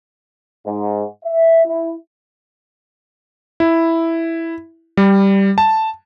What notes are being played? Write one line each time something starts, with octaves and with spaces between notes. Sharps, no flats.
G#2
E5
E4
E4
G3
A5